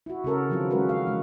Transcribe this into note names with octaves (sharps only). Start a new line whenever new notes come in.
E4 F#4
C#3 C#4 A4 A#4
D#3 F3 F#3 C4 E4 F4
G#3 C#4 F#4 A#4 B4
F5
E3 G#3